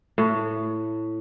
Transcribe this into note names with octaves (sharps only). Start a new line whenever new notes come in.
A2